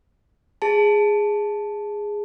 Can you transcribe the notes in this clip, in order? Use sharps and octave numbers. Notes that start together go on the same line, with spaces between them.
G#4 A5